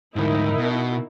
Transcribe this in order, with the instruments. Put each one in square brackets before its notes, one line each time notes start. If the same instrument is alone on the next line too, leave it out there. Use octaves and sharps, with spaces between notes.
[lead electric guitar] D2 G#2 [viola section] D#4 E4 A#4
[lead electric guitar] B2